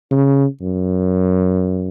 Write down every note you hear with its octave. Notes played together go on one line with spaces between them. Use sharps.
C#3
F#2